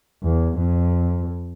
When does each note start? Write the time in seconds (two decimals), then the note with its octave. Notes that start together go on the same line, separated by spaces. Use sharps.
0.24 E2
0.58 F2